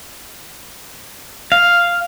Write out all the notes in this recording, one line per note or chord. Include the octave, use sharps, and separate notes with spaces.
F5